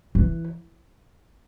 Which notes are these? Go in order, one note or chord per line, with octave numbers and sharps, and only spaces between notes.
E3